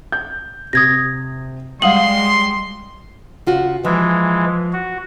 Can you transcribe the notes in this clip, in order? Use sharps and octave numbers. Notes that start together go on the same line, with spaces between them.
G6
C3 D#6 G#6 A#6
G3 G#3 F5 F#5 C6 D#6 F#7
C#3 F4 F#4
E3 F3 G#3
F#4